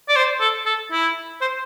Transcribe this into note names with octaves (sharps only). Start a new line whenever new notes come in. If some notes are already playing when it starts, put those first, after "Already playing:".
D5
C5
A4
A4
E4
C5